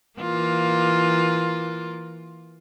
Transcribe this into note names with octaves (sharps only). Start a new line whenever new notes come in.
E3 A#3 F4